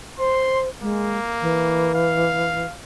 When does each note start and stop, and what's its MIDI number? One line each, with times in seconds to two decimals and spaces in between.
0.19 0.69 72
0.19 0.61 84
0.82 1.18 56
0.82 1.93 58
1.41 2.66 52
1.95 2.74 77